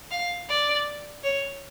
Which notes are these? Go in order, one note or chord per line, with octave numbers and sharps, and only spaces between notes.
F5
D5
C#5